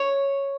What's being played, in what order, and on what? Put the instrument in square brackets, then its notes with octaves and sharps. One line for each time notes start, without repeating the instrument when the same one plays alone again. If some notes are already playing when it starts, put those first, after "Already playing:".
Already playing: [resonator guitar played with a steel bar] C#5